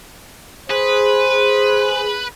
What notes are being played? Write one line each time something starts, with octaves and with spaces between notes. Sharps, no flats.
G#4 B4 C5